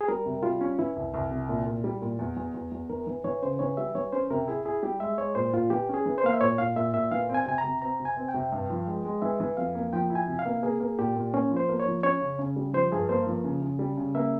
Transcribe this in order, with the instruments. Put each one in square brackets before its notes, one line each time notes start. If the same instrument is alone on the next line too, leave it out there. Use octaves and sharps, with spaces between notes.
[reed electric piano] G#4
[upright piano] G3 [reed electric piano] A#4
[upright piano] C3
[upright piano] G3 [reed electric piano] F4
[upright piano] C#4
[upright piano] E3 [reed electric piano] E4
[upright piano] C2
C2
C3
A#2
A#2
G3
A#2
E2
E2
E2
E2
[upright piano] E3 [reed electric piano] A#4
[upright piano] E3
[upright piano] E3 [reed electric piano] C#5
[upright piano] C#3 [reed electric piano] C5
[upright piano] E3 [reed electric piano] C#5
[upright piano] G3 [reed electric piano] E5
[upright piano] E3 [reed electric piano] C#5
[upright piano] C#4 [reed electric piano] C5
[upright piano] C3 [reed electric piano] A#4
[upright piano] E4 [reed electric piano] G#4
[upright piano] E4 [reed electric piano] G#4
[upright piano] G3 [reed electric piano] G4
[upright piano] G#3 [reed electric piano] E5
[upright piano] G#3 [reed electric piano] C#5
[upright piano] A#2 [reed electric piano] C5
[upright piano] A#2 [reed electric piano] F4
[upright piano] E3 [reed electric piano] G4
[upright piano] C#4 [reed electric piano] G#4
[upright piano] E3
[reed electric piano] C5
[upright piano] A#3 [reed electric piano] F5
[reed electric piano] E5
[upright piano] A#2 [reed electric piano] C#5
[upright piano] A#2 [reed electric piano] F5
[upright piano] A#2 [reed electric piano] E5
[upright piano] A#2 [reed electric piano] E5
[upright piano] E3 [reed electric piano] F5
[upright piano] C4
[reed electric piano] G#5
[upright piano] C3 [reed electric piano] G#5
[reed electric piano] A#5
[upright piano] C3
[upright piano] C4 [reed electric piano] A#5
[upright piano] C3
[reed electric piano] G#5
[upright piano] C4
[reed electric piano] G5
[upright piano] C3
G2
F3
G#3
G#3
[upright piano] E3 [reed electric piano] E5
[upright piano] E3
[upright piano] F2 [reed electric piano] F5
[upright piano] A#3
[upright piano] F3 [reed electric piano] G5
[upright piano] E4
[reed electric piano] G#5
[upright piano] C3
[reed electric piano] F5
[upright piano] A#3
[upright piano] A#3 [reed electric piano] G#4
[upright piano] A#3
[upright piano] A#2 [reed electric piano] G4
[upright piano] A#2
[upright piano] A#3 [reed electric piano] C#4
[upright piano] F3
[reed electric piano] C5
[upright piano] A#3
[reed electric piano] C#5
[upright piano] F3
[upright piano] C#4 [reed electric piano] C#5
[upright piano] C#3
C#3
G3
[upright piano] F3 [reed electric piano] C5
[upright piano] G2 [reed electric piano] G#4
[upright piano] A#3 [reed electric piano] C5
[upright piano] F3
C#3
C#3
G3
C#3
[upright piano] A#3 [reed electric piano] E5